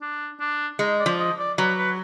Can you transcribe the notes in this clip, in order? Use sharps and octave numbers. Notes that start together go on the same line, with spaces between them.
D4
D4
G#3 D#4
D5
F3
D#5
D5
F#3 B4
B4